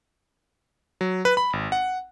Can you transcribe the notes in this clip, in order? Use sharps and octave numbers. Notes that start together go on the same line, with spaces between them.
F#3
B4
B5
G#1
F#5